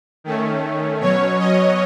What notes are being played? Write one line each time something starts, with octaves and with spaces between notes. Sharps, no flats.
D#3 A3 C#4
B2 F#3 C#4 C#5
D#5